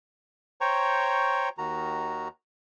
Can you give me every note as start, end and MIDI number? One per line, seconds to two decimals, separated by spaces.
0.61 1.49 72
0.61 1.49 73
0.61 1.49 79
0.61 1.49 82
0.61 1.49 85
1.58 2.28 39
1.58 2.28 51
1.58 2.28 66
1.58 2.28 82